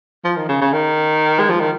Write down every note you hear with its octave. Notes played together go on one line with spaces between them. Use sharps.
F3
D#3
C#3
C#3
D#3
G#3
F3
D#3